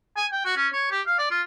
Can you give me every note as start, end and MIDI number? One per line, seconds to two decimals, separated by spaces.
0.16 0.26 80
0.32 0.45 79
0.45 0.56 66
0.56 0.67 61
0.73 0.87 73
0.91 1.02 67
1.06 1.18 77
1.18 1.26 74
1.31 1.41 65